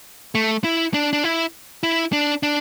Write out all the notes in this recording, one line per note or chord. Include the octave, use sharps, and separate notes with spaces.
A3
E4
D4
D4
E4
E4
D4
D4